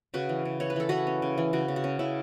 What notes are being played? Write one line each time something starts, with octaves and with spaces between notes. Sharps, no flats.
C#3 F#4 B4
E3
C#3
E3 C#5
B4
E3 A4
E3 F#4 B4
C#4
C#3
E3
C#3 F#4
C#3
F#4
C#4
C#3 E4